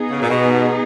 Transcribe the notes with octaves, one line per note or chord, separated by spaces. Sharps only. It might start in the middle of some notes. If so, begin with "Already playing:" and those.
Already playing: B3 D#4 G#4
C#3
A#2
B2